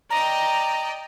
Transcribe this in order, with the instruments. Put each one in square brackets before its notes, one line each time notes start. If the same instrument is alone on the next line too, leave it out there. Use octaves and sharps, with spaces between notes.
[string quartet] D5 D#5 G5 [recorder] A#5